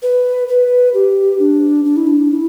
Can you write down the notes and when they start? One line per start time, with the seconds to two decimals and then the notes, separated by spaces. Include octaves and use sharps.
0.02 B4
0.48 B4
0.94 G4
1.39 D4
1.85 D4
1.97 E4
2.07 D4
2.32 E4